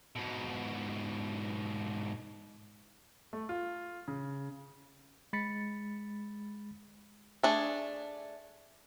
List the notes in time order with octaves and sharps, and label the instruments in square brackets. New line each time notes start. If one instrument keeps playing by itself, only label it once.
[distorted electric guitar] G#2 B2
[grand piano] A3
F4
C#3
[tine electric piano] G#3 B5 A6 B6 C#7
[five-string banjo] A3 D4 G#4